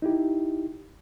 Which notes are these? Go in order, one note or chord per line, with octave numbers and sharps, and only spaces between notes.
D#4 E4 G4